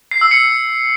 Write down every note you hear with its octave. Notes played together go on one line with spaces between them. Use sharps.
C7
E6
C#7